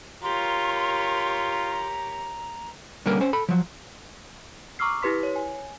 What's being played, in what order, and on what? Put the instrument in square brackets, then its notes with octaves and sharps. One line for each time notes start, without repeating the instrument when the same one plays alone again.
[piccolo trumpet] F4 [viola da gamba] G4 A#4 C#5 [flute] A#5 [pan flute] C6
[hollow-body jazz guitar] D3 G3 A#3 C#4 A#4 B4
C#4 C5
A4 B5
F3 F#3
[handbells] A#5 C#6 D6 E6 F6 C7
E4 G4 B4 C6 B6
C#5
G#5